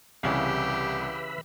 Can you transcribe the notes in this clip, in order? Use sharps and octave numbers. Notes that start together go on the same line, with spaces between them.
C2 C#3 E3 G4 B4 E5 F5 B5